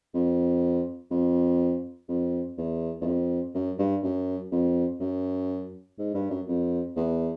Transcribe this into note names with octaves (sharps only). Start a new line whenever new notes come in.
F2
F2
F2
E2
E2
F2
F#2
G2
F#2
F2
F#2
G#2
G2
F#2
F2
E2